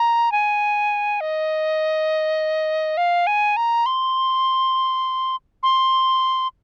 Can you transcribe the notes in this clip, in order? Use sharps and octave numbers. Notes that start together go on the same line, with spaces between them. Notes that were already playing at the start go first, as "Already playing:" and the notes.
Already playing: A#5
G#5
D#5
F5
G#5
A#5
C6
C6